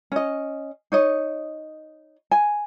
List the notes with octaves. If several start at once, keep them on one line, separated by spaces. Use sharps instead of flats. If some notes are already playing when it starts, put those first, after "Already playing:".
C#4 D#5
D#4 C#5 D#5
G#5